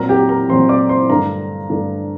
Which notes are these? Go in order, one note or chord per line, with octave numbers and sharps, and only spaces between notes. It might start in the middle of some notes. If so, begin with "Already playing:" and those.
Already playing: A#2 F#3 C4 A#4 A#5
G4 G5
A#4 A#5
A#2 F#3 C4 C5 C6
D5 D6
C5 C6
G2 D3 A3 D4 A#4 A#5
G2 D3 A3 D4